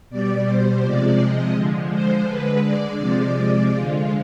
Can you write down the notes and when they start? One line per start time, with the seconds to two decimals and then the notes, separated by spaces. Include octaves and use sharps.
0.10 B2 G3 D5
0.46 C5
0.82 C3 F3 G#3 D5
1.18 D#5
1.55 D3 F3 G#3
1.92 C5
2.27 D3 G#3 B4
2.63 D5
2.99 C3 F3 G#3
3.72 D3 F3 G#3 F4